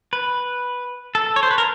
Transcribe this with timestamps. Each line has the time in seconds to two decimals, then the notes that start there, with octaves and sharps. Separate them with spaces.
0.13 B4
1.15 A4
1.36 C#5
1.43 C5
1.51 B4
1.58 A#4